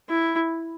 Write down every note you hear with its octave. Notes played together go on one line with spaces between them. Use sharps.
E4